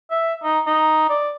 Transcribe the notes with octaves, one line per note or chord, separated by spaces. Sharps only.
E5
D#4
D#4
D5